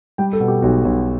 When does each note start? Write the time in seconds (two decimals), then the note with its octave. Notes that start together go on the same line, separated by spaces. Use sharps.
0.18 G3 G5
0.33 A4
0.40 B2
0.48 G4
0.62 B1 F#4
0.85 B1